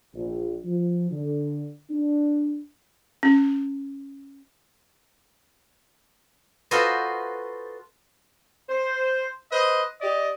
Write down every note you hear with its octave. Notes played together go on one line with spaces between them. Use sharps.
A#1
F3
D3
D4
C#4
F4 F#4 A4 B4 C5 D#5
C5
B4 C5 D#5
G4 D5 D#5